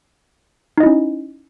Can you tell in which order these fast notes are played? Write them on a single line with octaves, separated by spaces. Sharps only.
D#4 D#5 E4 C#4